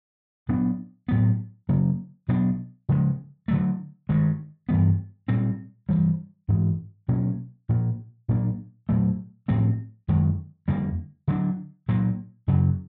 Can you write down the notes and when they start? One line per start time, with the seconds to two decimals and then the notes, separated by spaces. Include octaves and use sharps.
0.49 A#2 F#3 B3 D4
1.08 A2 F#3 B3
1.69 C#3 F#3 A#3
2.28 B2 F#3 B3 D4
2.89 C#3 F3 G#3
3.48 D3 F#3 A3
4.09 G2 D#3 G#3
4.69 G2 E3 G3 B3
5.28 A#2 G3 C4
5.89 G2 E3 G3
6.48 G#2 E3 G#3
7.08 B2 F#3 A#3 C#4
7.69 A#2 F3 A#3
8.28 A#2 F#3 A#3 D4
8.89 A#2 F#3 A3
9.48 A2 F3 A3 C4
10.08 F#2 D#3 G#3
10.68 F2 D3 G3 A#3
11.28 D3 F#3 A#3 D4
11.88 A#2 F#3 A#3
12.48 F#2 C#3 F#3